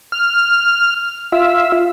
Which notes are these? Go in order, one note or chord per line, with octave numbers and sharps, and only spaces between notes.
F6
F4 E5